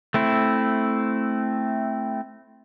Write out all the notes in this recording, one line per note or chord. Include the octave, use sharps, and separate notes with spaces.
A3 C4 E4